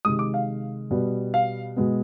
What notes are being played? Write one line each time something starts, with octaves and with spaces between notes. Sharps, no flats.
C3 D#3 G#3 D#6
D6
F5
B2 G3 B3
F5
B2 G#3 B3